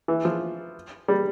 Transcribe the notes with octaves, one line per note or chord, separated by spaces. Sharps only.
E3
F3
G3